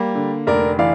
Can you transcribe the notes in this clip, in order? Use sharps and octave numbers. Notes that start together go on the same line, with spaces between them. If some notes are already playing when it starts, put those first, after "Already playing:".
Already playing: G3 A#3
D3
F1 A#4 D5
E3 D5 F5